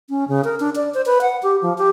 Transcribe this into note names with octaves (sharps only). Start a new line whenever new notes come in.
C#4
C#3
A#4
D4
D5
C5
B4
F#5
G4
F3
G4